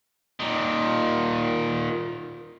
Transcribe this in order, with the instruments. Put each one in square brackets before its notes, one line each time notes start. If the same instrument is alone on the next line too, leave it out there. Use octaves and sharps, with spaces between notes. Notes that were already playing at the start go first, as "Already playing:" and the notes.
[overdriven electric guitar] A#2 D#3